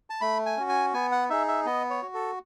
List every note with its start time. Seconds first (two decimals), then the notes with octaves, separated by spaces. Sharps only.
0.10 A5
0.21 A3 B5
0.46 G#5
0.57 C#4 F#4
0.69 G#5
0.93 B3 G#5
1.12 F#5
1.30 D#4 G#4 E5
1.48 E5
1.66 B3 D#5
1.90 C#5
2.03 F#4
2.14 A4